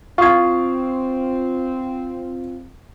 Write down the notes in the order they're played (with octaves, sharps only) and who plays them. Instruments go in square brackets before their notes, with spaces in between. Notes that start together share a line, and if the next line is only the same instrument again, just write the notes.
[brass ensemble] C4 [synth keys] F4 [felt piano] F5 G#6 [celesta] C#6 D#6 C7